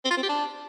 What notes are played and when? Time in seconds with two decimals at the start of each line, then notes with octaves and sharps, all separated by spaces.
0.05 C4
0.11 F4
0.17 C4
0.23 G4
0.29 D4